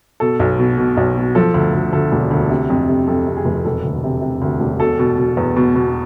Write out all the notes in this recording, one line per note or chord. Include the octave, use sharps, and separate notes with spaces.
B2 A4
B1
B2
B2
B1
B2
F3 A4
D2
D2
D2 A4
E1
D2
C3
F2
C3
F2 A4
C3
G#4
F1
E1 A4
D2
C3
C3
D2
E1
B2 A4
B2
B2
E2
B2
B2